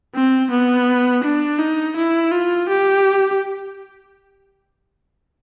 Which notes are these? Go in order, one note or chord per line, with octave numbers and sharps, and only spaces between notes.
C4
B3
D4
D#4
E4
F4
G4